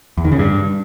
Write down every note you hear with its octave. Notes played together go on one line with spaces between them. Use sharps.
E2
D#3
C#3
G2